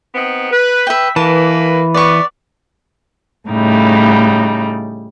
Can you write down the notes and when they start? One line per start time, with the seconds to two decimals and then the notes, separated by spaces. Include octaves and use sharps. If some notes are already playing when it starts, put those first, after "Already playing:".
0.13 B3 C4 D#4
0.50 B4
0.87 B4 E5 G5
1.16 E3 A#3 B4 A5
1.94 B3 D5 C#6
3.48 A2 C#3 G3 D#4